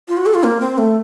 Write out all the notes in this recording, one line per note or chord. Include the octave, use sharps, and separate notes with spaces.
F4
F#4
A4
F4
A#3
C4
A3